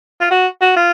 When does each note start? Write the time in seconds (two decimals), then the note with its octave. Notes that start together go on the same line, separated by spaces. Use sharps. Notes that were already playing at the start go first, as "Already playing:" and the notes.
0.20 F4
0.30 F#4
0.61 F#4
0.76 F4